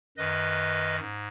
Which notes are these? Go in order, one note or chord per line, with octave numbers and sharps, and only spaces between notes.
F#2 D#3 B4 D#5
G#2